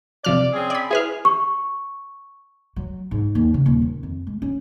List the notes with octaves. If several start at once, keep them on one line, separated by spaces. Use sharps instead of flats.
C3 F3 D5 F6
C4 C#4 G#4
D5 B5
E4 G#4 B4 F6
C#6
F#3
G#2
D#2
C#3
D#1
D#3
F2
G#3
C#4